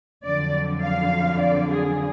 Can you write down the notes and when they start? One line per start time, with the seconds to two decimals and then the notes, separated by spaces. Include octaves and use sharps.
0.23 F2 D3 F#3 D5
0.82 F5
1.41 D5
1.70 G#4